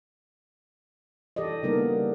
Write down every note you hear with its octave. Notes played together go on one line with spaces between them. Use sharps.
E3 G4 A4 D5 D#5
C#3 G3 A#3 B3 D#4 A#4